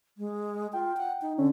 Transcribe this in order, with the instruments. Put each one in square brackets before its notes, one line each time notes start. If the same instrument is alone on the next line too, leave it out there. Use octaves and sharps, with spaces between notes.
[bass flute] G#3
[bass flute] F4 [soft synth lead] G5
[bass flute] F#5
D#4
[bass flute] D3 [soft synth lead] C#4